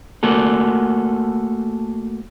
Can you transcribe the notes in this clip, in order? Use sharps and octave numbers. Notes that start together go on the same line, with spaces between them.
A3 A#3 F#4 A4